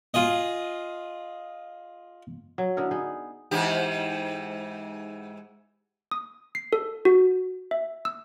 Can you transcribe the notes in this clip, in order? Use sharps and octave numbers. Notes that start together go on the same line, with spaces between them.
F4 G#4 D#5
F#3
D3 B3 E4 A#4
B3 D#4 G#4
G#2 E3 G4
D#6
C7
A4
F#4
E5
E6